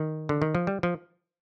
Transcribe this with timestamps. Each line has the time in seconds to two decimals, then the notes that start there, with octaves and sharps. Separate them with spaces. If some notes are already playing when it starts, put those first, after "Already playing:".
Already playing: D#3
0.29 D3
0.42 D#3
0.55 F3
0.67 G3
0.83 F3